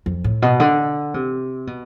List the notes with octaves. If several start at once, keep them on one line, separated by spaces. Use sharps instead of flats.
F2
A2
B2
D3
C3
B2